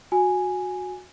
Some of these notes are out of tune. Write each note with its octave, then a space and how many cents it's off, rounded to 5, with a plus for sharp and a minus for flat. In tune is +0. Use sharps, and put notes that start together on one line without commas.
F#4 -15 G#5 +0